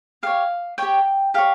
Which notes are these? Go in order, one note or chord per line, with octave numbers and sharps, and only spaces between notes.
G4 C#5 F5
G4 C#5 G5
G4 C#5 F5